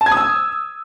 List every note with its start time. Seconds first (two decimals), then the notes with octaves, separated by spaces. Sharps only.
0.01 A5
0.06 G#6
0.12 D#6
0.17 E6